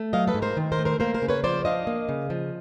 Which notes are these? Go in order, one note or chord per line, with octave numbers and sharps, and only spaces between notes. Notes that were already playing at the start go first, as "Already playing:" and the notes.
Already playing: A3
F#3 D#5 F5
A4 B4
G#2
A#4 C5
D#3
A#4 C5
A3
A#4 C5
A#3 A#4 C5
A#4 C5
C#3
B4 C#5
F3 C5 D5
D4 D#5 F5
A#3
C#3
F3